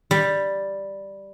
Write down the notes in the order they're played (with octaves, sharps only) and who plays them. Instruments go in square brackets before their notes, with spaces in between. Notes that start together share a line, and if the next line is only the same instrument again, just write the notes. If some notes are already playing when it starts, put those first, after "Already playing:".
[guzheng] G3